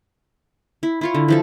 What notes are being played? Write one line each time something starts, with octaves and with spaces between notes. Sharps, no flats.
E4
E4 F4 C#5
D3
E3 F3 A4